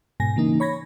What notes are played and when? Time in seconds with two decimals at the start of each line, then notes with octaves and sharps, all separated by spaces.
0.20 G#2 B2 G#5 A#6
0.36 C#3 E3 A#3 D#4
0.60 C#5 B5 G#6 A#6